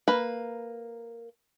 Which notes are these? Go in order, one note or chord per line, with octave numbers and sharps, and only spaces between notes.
A#3 B4 B5